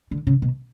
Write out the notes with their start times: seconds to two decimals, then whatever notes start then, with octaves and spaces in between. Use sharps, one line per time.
0.11 D3
0.27 C#3
0.42 B2